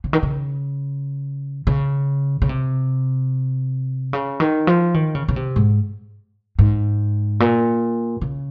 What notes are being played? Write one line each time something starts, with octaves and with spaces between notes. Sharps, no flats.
C#3
D#3
C#3
C#3
C#3
C3
C#3
D#3
F3
D#3
C#3
C#3
C3
G#2
G#2
A#2
C#3